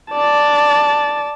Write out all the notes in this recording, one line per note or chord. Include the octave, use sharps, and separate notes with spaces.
D5 A5